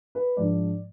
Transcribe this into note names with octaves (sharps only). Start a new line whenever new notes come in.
B4
G#2 F3 G#3 D4 D5